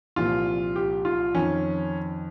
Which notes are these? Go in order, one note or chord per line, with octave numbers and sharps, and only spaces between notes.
C2 A#2 F3 F4
G4
F4
F2 D#3 C#4